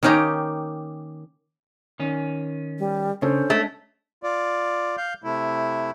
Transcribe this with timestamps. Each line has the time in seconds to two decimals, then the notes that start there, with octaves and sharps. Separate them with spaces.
0.03 D#3 A#3 C#4 D#4 G4
2.00 D#3 C#4
2.79 G3
3.22 C#3 C#4 D4 A4 C5
3.50 G#3 A3
4.23 F4 D5
4.97 F5 G6
5.24 C3 A3 E4